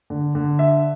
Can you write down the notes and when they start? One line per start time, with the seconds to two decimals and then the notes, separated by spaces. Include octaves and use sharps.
0.10 D3
0.35 D3
0.59 E5